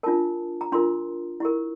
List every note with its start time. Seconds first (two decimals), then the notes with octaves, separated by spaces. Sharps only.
0.03 D4 F4 A#4 A5
0.61 A#5
0.72 D4 F4 A#4 C6
1.40 E4 G4 A#4